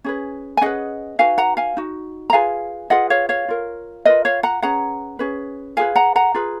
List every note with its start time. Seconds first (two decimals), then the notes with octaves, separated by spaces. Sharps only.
0.04 C#4 G#4 B4
0.57 G#5
0.61 C#4 G#4 B4 D#5 F#5
1.19 D#4 F#4 B4 F5 G#5
1.38 F#5 A#5
1.57 F5 G#5
1.77 D#4 F#4
2.30 A#5
2.33 F4 G#4 B4 F5 G#5
2.90 F4 G#4 B4 D#5 F#5
3.10 C#5 F5
3.29 C#5 F5
3.48 F4 A#4
4.05 F4 A#4 B4 D#5
4.25 C#5 F5
4.43 F#5 A#5
4.62 C#4 G#4 B4 F#5 A#5
5.19 C#4 G#4 B4
5.77 F4 G#4 B4 F5 G#5
5.96 F#5 A#5
6.16 F#5 A#5
6.34 F4 G#4 B4